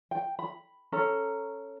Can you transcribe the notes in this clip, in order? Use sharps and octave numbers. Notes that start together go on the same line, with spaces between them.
G5
B5
C#4 A4 A#5